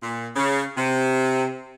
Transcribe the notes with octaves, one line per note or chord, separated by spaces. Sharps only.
A#2
C#3
C3